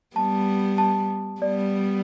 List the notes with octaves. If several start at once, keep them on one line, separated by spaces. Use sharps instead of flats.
G3 B3 A5
A5
G3 B3 D5